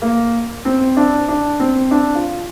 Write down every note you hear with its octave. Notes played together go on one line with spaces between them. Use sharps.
A#3
C4
D4
D4
C4
D4
F4